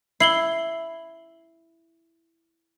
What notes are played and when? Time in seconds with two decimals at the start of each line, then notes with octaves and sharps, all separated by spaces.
0.20 E4 C7 F#7 G7